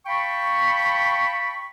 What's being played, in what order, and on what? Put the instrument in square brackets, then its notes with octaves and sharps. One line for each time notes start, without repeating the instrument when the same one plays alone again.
[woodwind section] F5 G5 A5 B5 C#6